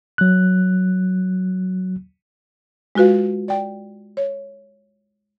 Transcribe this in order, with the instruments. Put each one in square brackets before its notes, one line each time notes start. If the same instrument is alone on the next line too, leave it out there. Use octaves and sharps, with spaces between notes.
[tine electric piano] F#3 F#6
[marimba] G#3 F4 F#4 B4 F5
D5 G5
C#5